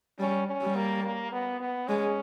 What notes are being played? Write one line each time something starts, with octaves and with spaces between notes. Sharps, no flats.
G3 C#4
C#4
G3
A#3
A#3
B3
B3
G#3 C#4